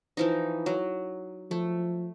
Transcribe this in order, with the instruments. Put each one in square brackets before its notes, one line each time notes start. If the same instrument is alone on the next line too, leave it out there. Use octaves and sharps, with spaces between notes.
[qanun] E3 F3 D#4
F#3
[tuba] F3 [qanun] A3